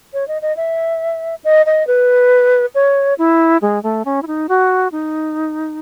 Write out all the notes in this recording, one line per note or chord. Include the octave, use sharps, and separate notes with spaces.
C#5
D#5
D#5
E5
D#5
D#5
B4
C#5
E4
G#3
A3
C#4
E4
D#4
F#4
D#4